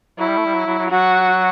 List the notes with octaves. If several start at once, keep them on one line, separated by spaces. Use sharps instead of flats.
F#3 E4
G3
A3
G3
F#3
F#3
F#3
F#3 F#4